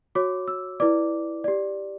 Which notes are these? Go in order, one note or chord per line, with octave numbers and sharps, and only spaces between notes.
F#4 C#5 D6
E6
E4 B4 D5 D6
G4 D5